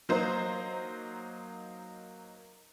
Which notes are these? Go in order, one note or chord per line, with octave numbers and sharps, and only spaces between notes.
F#3 A#3 D#4 C5